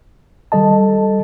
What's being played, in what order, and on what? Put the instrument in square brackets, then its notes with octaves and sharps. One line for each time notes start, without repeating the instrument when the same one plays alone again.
[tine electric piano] D#3 G3 A4 D#5 A5